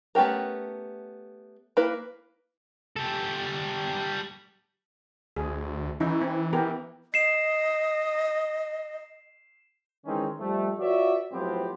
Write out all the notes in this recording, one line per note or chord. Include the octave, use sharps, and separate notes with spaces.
A3 B3 C#4 G4 A#4
A#3 E4 B4
G3 A4
D2 G#4
E3 C#4 D#4 E4
C4
B3 G4 A#4
D#5 C7 E7
D#3 E3 G#3 C4 C#4 D#4
F2 F3 G3 A3
F4 F#4 B4 C#5 D5 E5
A2 F3 F#3 B3 C4 G4